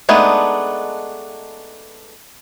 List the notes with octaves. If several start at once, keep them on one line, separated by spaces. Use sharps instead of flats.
G#3 A3 B3 D4 D#4